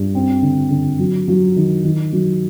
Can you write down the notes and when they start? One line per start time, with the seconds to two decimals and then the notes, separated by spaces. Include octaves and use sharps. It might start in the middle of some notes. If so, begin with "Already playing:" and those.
Already playing: G2
0.15 C4
0.42 D3
0.70 D3
0.99 F#3
1.28 F#3
1.56 D#3
1.84 D#3
2.13 F#3